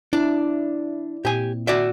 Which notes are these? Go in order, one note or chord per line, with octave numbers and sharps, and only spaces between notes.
D4 E4 D5
A#2 C4 G4 G#5
F#4 D5 E5